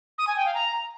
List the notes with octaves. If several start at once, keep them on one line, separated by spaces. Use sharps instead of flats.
D#6
G#5
G5
F5
A#5